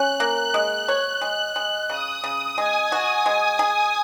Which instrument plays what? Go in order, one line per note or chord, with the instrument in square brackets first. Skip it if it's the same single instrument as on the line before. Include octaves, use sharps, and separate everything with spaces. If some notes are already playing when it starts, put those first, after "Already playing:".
Already playing: [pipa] C#4 [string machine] F#6
[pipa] A#3
[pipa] G#3 [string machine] F#6
[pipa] C#5
G#3
G#3
[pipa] C#3 [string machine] D#6
[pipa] C#3
[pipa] G#3 [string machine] G#5
[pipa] F#4
G#3
G#4